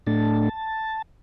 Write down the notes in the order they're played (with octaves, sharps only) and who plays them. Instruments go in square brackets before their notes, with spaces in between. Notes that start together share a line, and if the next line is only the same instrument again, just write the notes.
[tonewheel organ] A2 A3 D4 A5